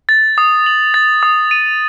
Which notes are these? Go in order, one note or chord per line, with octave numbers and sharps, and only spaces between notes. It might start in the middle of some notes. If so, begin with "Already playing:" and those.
A6
D#6
F#7
A6
D#6
D#7